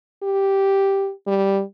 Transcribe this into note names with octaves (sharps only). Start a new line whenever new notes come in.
G4
G3